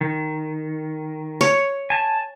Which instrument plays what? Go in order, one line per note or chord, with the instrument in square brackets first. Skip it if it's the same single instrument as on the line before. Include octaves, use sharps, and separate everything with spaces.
[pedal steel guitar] D#3
[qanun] C#5
[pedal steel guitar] G#5 A5